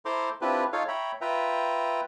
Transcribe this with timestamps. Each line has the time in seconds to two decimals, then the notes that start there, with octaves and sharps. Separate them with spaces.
0.05 E4 A4 C5 A#5 C6 D6
0.41 C4 D4 E4 F4 G4 B4
0.73 D#4 F4 A4 C#5 F5
0.88 C#5 E5 G5 A#5 B5
1.21 F4 B4 E5 G5 A#5